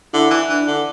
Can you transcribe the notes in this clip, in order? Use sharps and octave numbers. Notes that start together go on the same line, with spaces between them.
D3 E4
E3
E3 D4
D3